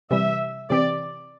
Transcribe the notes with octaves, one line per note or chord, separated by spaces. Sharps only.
C3 E3 G3 E5
C3 E3 C4 G4 D5